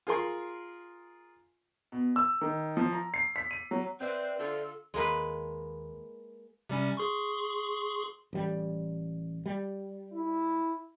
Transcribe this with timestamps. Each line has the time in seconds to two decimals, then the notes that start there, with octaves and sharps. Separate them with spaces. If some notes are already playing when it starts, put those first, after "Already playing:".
0.07 F4 G#4 A#4 C6
1.92 B2
2.16 E6
2.41 D#3
2.77 F3
2.93 A#5
3.14 C7
3.36 B6
3.51 D#7
3.71 F#3
4.00 C4 B4 C5 D5 E5
4.39 D3 F4 A4
4.94 D#2 G#3 A#3 B4
6.70 C3 G3 C#4
6.97 G#4 C6 C#6
8.33 A1 G3
9.46 G3
10.13 E4